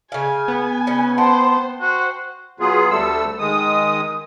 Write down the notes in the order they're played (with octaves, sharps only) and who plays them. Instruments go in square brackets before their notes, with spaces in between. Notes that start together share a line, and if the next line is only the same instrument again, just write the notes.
[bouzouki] C#3 F5 [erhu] G#5
[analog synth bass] B3
[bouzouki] C#3 C#4
[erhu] C5 [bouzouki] F#5 G5 A5 [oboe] C6
[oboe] F#4 [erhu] C5
[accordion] F#3 B3 F4 G#4
D2 G3 A3 A4 E6
D#3 G#3 D#6